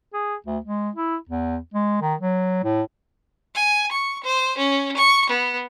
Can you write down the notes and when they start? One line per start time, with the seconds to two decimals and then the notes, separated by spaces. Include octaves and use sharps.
0.13 G#4
0.46 D2
0.64 G#3
0.95 E4
1.29 E2
1.74 G#3
2.02 D#3
2.21 F#3
2.64 A2
3.55 G#5
3.91 C#6
4.23 C5
4.57 C#4
4.96 C#6
5.29 B3